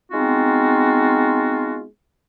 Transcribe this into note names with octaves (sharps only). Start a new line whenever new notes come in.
G#3 B3 C4 D#4 F4 F#4